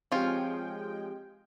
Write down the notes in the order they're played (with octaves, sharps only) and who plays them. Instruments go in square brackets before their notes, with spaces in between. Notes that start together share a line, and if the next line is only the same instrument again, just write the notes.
[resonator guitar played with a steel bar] F3 [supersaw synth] G#3 G5 [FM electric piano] C4 G4 [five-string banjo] C#4 F4